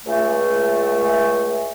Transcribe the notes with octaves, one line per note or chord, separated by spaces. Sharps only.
C#2 A3